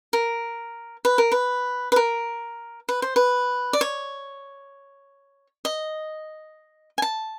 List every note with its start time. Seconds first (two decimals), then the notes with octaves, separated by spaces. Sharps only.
0.13 A#4
1.05 B4
1.18 A#4
1.32 B4
1.92 B4
1.96 A#4
2.89 B4
3.02 C5
3.16 B4
3.73 D5
3.81 C#5
5.65 D#5
6.98 G#5
7.02 A5